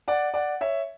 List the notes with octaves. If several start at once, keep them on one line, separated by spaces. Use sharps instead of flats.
D5 F#5
D5 F#5
C#5 E5